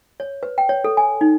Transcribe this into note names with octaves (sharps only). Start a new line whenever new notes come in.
C#5
B4
G5
C#5
A4
G#5
D#4